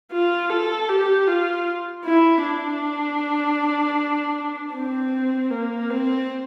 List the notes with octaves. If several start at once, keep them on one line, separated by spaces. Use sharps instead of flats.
F4
A4
G4
F4
E4
D4
C4
A#3
C4